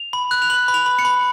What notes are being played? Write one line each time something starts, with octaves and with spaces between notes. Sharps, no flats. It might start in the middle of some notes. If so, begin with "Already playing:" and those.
Already playing: F7
B5
F#6
F7
B5 F#7
B5
F7
B5
C#7
B5